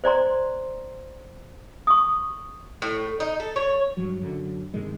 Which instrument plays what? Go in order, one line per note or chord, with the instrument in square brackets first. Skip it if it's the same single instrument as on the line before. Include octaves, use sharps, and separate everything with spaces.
[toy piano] C5 D5 A#5 C6
C#6 D#6
[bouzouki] A2
D#4
A4
C#5
[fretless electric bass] G2 F3 F#3
F#2 D3 F#3
G2 C3 D#3 G#3